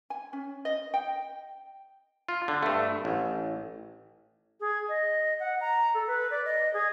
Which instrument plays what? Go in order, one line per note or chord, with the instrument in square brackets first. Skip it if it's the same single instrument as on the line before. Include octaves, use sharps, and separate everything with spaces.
[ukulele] G#5
C#4
D#5
G5
[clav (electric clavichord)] F4
D3
G2 A3
A1
[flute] G#4
D#5
F#5
A#5
A4
B4
D5
D#5
G#4